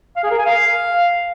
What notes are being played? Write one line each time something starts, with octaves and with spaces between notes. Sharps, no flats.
F5
G#4
A#4
G#5
F5